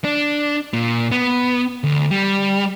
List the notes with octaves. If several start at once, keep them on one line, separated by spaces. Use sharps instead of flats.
D4
A#2
B3
D2
G3